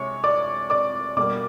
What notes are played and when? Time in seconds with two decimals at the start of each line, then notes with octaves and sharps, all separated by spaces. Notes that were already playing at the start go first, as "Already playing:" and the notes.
Already playing: C3 G#3 C#5 C#6
0.24 D5 D6
0.70 D5 D6
1.17 B2 G3 A#3 D5 D6